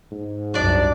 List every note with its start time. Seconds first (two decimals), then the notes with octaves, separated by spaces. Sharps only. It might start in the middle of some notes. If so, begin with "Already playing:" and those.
0.11 G#2
0.54 C2 F#2 D4 D5